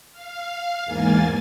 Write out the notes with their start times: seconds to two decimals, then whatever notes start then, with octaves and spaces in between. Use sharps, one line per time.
0.12 F5
0.86 E2 G#2 A#3 G#5 A6